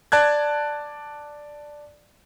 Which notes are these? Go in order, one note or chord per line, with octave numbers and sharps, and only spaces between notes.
D5 A5 F#6 G#6